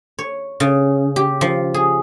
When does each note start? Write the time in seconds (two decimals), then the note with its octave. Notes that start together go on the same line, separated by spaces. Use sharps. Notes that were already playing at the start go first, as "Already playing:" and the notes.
0.19 C#5
0.60 C#3
1.16 G4
1.41 F3
1.74 G#4